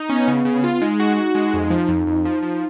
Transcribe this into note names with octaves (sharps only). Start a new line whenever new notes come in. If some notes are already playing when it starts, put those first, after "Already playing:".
Already playing: D#4
B3 C#4
C#3
C#3
F4
G#3 D#4
F#4
F#4
G#3
F2
F3
F2
F2
F3
F3